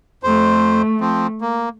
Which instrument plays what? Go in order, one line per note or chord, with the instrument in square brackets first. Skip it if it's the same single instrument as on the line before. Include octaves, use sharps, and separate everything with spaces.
[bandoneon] F2 C5 [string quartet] A3
[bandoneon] F3 C4
A#3